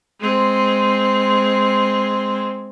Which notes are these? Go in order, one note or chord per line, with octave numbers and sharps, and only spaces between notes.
G#3 C4